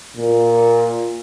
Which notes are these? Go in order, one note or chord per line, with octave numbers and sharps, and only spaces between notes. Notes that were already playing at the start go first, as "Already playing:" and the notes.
A#2